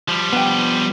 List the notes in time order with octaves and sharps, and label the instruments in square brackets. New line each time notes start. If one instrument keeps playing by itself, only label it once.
[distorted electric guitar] F3 G3
[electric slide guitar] B3 [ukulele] D4 G5